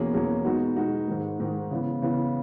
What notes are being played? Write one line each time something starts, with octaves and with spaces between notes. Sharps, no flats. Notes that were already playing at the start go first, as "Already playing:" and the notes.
Already playing: E2 B2 A#3 C#4 G#4
E2 B2 A#3 C#4 G#4
B2 G#3 B3 D#4 F#4
B2 G#3 B3 D#4 F#4
G#2 D#3 G#3
G#2 D#3 G#3
C#3 E3 B3
C#3 E3 B3